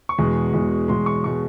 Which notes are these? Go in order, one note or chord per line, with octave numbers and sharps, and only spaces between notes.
C#6
E2 B2 G#3
E2 B2 G#3
E2 B2 G#3 C6
C#6
B2 G#3 C#6